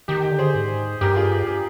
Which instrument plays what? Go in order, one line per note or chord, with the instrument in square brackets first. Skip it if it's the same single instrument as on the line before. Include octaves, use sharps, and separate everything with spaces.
[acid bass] D#3 [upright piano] G4
[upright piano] G4
[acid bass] D3
[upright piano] G#4 C5
[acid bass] G#2
[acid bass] G2 [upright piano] G4 A#4
[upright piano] F4 G#4
G4
G4